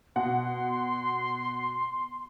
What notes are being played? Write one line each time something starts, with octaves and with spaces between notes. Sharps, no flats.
B2 F#5 C6